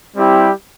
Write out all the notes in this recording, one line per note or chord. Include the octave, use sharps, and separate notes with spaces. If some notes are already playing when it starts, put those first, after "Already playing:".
G3 C4 E4 G4